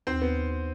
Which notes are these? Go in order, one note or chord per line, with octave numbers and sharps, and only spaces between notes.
D#2 C4 C5
B3